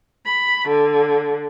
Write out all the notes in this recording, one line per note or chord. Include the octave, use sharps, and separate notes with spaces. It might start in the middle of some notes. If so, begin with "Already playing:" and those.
B5
D3